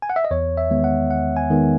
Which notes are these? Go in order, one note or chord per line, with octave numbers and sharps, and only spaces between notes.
G#5
F#5
E5
D#5
E2 C#5
E5
D#3 G#3 B3
F#5
E2 F#5
G#5
D#3 G#3 B3